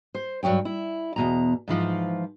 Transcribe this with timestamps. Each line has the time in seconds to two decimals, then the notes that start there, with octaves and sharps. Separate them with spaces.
0.15 C5
0.43 G2 F#3 E4 C#5 G5
0.65 E4
1.16 E2 B2 A#5
1.68 G#2 E3 F3 F4